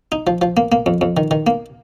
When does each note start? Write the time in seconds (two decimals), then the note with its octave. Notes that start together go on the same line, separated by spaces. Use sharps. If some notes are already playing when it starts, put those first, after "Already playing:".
0.12 D#4
0.27 F3
0.42 F3
0.57 A#3
0.72 A#3
0.86 F2
1.01 F2
1.17 D#3
1.31 D#3
1.47 A#3